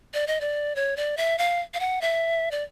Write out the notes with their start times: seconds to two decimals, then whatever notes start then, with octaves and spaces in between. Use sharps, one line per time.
0.14 D5
0.27 D#5
0.41 D5
0.76 C#5
0.97 D5
1.17 E5
1.38 F5
1.74 F5
1.80 F#5
2.01 E5
2.51 D5